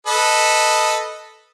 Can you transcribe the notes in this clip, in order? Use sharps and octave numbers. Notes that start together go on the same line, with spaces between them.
A4 B4 D#5